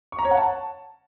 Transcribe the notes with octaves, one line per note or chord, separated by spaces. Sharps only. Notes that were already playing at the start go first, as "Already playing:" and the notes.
C#6
A#5
C#5
F#5
A5